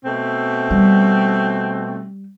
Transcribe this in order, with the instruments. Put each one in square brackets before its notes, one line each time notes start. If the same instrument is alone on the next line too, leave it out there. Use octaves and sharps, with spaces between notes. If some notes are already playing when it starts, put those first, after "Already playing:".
[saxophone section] B2 A3 C4
[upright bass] G3